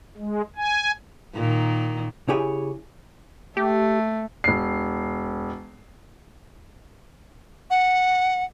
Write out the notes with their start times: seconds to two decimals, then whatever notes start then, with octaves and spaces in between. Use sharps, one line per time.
0.17 G#3
0.56 G#5
1.35 A#2 D#3
2.28 C#3 E4 G4 G#4 C#5 G#5
3.57 A3 G4
4.44 E1 C7
7.70 F#5